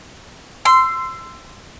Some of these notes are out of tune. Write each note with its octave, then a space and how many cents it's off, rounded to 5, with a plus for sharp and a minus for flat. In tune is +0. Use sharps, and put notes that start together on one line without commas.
C6 -10 E6 +20